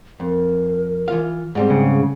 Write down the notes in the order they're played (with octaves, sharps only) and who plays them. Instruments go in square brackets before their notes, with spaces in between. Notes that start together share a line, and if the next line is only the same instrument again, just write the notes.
[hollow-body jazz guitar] F2 [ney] A#4
[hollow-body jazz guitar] E3 F4 F5
[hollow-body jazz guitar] G#2 G3 C4 [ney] G#4
[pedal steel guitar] C#3